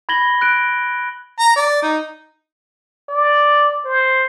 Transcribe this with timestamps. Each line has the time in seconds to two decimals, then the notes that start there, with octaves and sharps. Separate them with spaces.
0.09 B5 G#6 A#6 F#7 G7
0.41 F#6 D7
1.39 A#5
1.56 D5
1.82 D#4
3.09 D5
3.85 C5